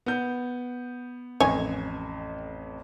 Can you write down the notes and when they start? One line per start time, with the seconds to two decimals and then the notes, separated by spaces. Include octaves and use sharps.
0.06 B3 G6
1.40 A1 F2 C#5 D#5 G#5